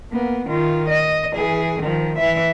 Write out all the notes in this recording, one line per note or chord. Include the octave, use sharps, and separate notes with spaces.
A#3 B3
D#3 F4
D#5
E3 G#4
D#3 F3
E3 E5